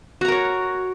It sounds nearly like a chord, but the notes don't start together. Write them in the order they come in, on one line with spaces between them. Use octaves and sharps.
F#4 A#5 A#4 C#5